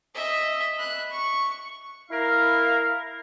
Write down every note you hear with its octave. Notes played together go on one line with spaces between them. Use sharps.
D#5 E5
B5 F#6
C#6
E4 A#4 F5